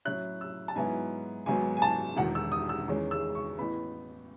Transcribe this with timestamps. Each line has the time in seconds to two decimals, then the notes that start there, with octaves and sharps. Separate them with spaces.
0.05 A2 F#3 C#4 E4 F#6
0.41 E6
0.68 A5
0.75 G#2 F#3 B3 E4 G#5
1.46 G#1 G#2 F#3 B3 G#5
1.77 G#5
1.82 A5
2.17 E1 E2 D#3 F#5
2.35 E6
2.52 D#6
2.69 E6
2.88 E2 D#3 G#3 C#4
3.11 E6
3.35 C#6
3.58 A1 A2 E3 B3 B5